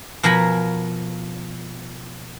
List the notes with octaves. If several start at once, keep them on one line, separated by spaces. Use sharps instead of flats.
B2 F3 A#4 G#5 B5